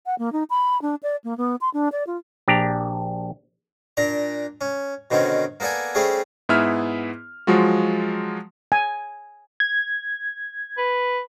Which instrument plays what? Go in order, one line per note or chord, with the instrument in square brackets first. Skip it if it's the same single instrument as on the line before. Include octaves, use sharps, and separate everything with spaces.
[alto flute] F#5
A#3
D#4
B5
D4
D5
A#3
B3
C6
D4
D5
F4
[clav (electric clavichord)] A#1 D4 G4 A#5
[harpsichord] A#2 D4 A#5
C#4
B2 D3 D#3 C4 C#4
A#3 B3 A4 D5 G#5
G3 A3 C4 C#4 G4 G#4
[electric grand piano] G#2 B3 E4 G#4 E5 F6
F3 F#3 G#3 F4 F#4
[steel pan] G#5
[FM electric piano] G#6
[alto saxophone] B4